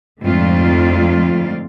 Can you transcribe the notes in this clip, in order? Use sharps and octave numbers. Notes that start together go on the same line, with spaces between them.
F2 G#2 D3 A3 F4 D5